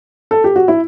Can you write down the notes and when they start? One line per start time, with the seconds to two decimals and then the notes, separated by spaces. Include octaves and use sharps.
0.31 A4
0.44 G4
0.56 F#4
0.68 E4